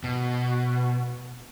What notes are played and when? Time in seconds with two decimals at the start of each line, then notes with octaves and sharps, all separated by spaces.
0.04 B2